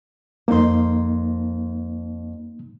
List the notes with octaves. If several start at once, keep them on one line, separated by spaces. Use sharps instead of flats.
F2 A#3 D#4 C5 C6